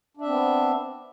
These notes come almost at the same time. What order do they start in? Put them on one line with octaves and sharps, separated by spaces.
D4 E5 C4 B3